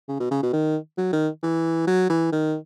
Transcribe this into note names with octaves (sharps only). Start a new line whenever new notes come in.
C#3
B2
C#3
B2
D#3
F#3
D#3
E3
F#3
E3
D#3